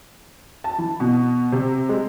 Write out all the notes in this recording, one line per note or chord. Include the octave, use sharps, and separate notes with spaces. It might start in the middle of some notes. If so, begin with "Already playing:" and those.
A5
E3
B2
C3
G#3